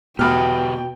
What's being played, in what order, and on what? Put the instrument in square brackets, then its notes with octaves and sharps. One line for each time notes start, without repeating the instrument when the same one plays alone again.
[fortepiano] E2 F6 [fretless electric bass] B2 [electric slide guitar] B3 G4 [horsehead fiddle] G5